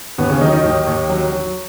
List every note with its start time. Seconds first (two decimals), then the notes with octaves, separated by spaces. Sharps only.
0.18 D#2 B3
0.30 C#3 C#4
0.41 D#3 F#3 D#4
0.52 D#3 D#4
0.64 D#2
0.87 D#2
1.10 F#3
1.32 F#3